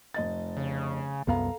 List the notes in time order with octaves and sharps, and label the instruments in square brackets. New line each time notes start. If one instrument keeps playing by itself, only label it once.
[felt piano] F1 D#5 A6
[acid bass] C#3
[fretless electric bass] C2 F#2 B3 [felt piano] A4 F5 A#5